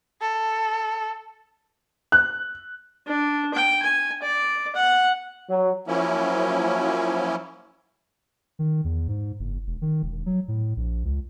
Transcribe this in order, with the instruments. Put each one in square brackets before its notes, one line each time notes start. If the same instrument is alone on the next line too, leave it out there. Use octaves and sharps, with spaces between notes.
[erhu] A4
[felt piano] F#6
[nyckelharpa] D4
G5
G#5
D5
F#5
[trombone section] F#3
[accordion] F3 F#3 A#3 C#4 E4
[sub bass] D#3
E2
G#2
F#1
E1
D#3
E1
F#3
A2
A#1
C#2